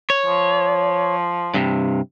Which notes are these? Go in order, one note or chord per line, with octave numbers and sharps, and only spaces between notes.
C#5
F3
G2 C3